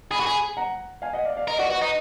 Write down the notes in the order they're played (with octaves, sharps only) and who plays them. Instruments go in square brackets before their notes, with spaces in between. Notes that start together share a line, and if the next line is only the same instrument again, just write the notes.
[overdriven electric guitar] G#4 [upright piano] B5
[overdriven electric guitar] F#4
[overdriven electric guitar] G#4 [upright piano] G#5 B5
[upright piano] F#5 A#5
F5 G#5
D#5 F#5
D5 F5
D5 F5
[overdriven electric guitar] A#4 [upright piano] D#5
[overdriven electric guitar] F#4 [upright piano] D5
[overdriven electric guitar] F#4 [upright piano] B4 D#5
[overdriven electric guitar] D#4